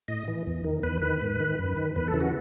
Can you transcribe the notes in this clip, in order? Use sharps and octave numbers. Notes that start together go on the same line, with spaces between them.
A2 D#5
E3
E2
D#3
E2 B4
D#3 B4
G#2
D#3
F#2
D#3
E2 B4
A4
C#3 E3
F#4